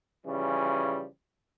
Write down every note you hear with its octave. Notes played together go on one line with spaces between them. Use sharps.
C#3 E3 F3 G3